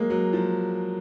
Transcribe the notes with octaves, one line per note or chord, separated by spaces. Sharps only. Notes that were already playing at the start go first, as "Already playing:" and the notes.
Already playing: F#3 G#3 A#3
F#3
F3